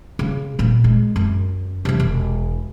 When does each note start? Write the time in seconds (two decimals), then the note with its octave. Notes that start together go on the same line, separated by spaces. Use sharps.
0.19 C#3
0.59 A#2 B3
0.84 G#3
1.16 F#2
1.85 C3 E3
2.00 E1